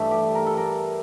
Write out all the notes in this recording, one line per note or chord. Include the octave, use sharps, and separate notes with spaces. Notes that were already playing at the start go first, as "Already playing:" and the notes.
Already playing: G2 E3 A3
G4
A#4
A4
A#4